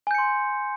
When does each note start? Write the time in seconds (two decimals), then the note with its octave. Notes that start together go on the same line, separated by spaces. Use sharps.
0.07 G#5
0.11 G6
0.15 C#7
0.18 C6